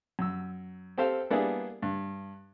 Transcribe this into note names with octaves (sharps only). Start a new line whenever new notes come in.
F#2 E6
C4 G4 A4 C5 F5 G5
G3 A#3 B3 D4 E4 G#4
G2